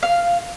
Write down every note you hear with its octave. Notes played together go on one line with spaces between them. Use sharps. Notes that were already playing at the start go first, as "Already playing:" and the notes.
F5